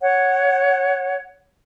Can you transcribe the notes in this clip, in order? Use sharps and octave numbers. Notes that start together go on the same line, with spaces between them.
C#5 F#5